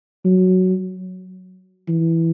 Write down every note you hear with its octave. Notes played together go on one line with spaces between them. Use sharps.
F#3
E3